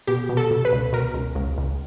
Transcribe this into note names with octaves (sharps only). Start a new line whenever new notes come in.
B2 G4
B2
A4
B2
B4
C#2
B2 A#4
C#2
C#2
C#2